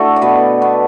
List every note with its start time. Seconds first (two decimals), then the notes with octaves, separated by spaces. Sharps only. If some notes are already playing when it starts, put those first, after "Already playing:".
Already playing: A3 D4 E4 F#4 A4
0.16 D5
0.21 B2 B3 B4
0.62 B3